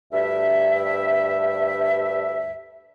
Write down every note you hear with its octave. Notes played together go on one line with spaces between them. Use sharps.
D2 G2 E5